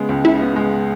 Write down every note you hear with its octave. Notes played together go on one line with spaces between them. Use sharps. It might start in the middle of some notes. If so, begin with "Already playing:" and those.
Already playing: C#3 G#3 B3
C#2
C#3 E4
B3
G#3